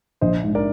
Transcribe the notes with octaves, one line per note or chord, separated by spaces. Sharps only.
A#1 C5 D#5
G#2
A#4 D5